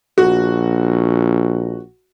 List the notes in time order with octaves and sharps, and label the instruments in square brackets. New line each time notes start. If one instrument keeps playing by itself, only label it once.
[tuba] A#1 [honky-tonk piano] F#4